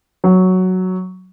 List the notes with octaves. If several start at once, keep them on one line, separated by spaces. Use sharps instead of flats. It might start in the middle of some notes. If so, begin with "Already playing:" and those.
F#3